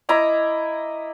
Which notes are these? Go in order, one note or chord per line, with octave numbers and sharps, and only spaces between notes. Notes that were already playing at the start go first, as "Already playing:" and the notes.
E4 D#5 A#5 D6